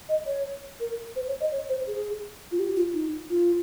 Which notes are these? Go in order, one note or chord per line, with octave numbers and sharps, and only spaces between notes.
D#5
C#5
A#4
C5
C#5
D#5
C#5
C5
G#4
F4
G4
F4
D#4
F4